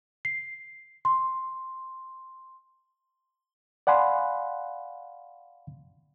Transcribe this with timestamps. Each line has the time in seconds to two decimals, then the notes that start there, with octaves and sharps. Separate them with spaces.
0.25 C7
1.05 C6
3.87 D5 F5 F#5 G#5 B5 C6